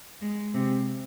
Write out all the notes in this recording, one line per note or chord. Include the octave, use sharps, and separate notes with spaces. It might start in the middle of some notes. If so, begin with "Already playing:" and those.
G#3
C3